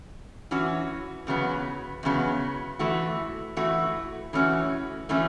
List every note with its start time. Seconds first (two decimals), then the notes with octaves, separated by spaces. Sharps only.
0.51 E3 C#4 F#4
1.27 E2 C#3 F#3 B3
2.03 E2 C#3 F#3 B3
2.79 E3 A3 F#4
3.57 E3 A3 F#4
4.33 E3 A3 C#4 F#4
5.09 E3 A3 C#4 F#4